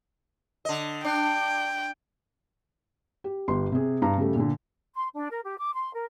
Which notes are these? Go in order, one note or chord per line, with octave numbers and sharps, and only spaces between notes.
D3 D#5
D4 G5
G4
G1 G4 C6
C3 G#4
G2 A#5
C#3 G3 A3
A#2 D3
C6
D4
A#4
G4
D6
C6
A#4